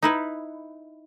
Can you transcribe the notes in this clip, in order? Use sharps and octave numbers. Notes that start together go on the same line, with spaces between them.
D#4 E4 B4